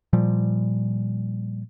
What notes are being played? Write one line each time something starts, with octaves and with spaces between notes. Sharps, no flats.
A#2 F3 G3